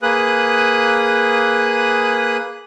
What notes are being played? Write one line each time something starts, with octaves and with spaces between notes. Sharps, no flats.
A#3 G#4 B4 D#6 F#6